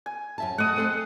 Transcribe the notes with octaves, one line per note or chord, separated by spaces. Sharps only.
G#5
F#2 E5 A5
A3 D#5 F#5 D#6
C4 A4 C5